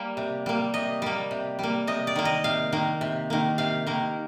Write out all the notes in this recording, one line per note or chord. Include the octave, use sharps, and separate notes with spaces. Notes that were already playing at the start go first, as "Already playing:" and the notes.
Already playing: G3 A#3
C3
G3 A#3
C3 D#5
G3 A#3
C3
G3 A#3
C3 D#5
D5
D#3 A#3
D#5
C3 F5
D#3 A#3
C3
D#3 A#3
C3 F5
D#3 A#3